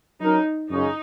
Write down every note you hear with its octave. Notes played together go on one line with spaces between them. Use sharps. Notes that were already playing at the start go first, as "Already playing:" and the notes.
F#3 C#4 D#4 A#4
F#2 C#3 G#3 C#4 D#4